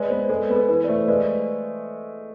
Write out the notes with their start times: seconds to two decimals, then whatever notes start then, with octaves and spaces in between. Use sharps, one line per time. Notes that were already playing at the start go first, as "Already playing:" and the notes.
Already playing: G#3 B4 D5
0.10 B3 C5
0.29 G#3 A4
0.50 B3 B4
0.56 A4
0.69 E3 B4
0.84 D5
0.88 A3 C5
1.08 G#3 B4 D5